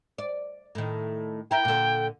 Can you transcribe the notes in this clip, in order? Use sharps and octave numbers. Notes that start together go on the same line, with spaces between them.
D5
A2 D#3
E4 A#4 G5
A#2 D3